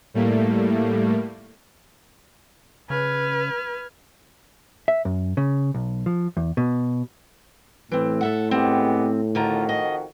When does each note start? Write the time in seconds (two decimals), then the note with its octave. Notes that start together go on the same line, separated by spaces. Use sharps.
0.14 A2 G3 A3 A#3
2.90 C#3 B4 F6 G#6
4.88 E5
5.05 F#2
5.37 C#3
5.74 B1
6.06 F3
6.37 E2
6.57 B2
7.92 A2 E3 C4
8.21 A4 E5 F#5
8.51 G#3 B3 C4 G4
9.35 F2 D3 D#3 F4 F#4 A#5
9.69 D#5